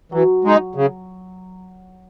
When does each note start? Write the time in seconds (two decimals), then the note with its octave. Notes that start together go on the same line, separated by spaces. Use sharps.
0.12 E3 F#3
0.44 G#3 D#4
0.75 C#3